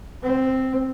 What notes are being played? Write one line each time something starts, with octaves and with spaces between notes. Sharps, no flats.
C4